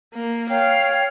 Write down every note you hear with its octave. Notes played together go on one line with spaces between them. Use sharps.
A#3
C#5 F5 G5